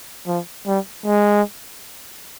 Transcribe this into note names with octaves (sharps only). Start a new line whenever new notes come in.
F3
G3
G#3